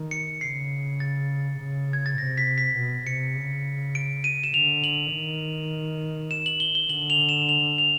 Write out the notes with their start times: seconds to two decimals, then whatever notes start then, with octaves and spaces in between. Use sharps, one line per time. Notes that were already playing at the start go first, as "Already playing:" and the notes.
Already playing: D#3
0.11 C#7
0.41 C#3 C7
1.00 A6
1.59 C#3
1.93 G#6
2.06 A6
2.18 C3 A#6
2.38 B6
2.58 B6
2.77 B2
3.07 C3 C#7
3.36 C#3
3.95 D7
4.24 D#7
4.44 E7
4.54 D3 F7
4.84 F#7
5.13 D#3
6.31 E7
6.46 F#7
6.60 G7
6.75 G7
6.89 D3 F#7
7.10 F7
7.29 E7
7.49 F7
7.78 F7